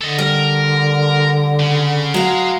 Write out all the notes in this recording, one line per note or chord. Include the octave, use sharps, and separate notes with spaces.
D3 A4 D#5
G3 A#4
C#3
F#3 G#3 F5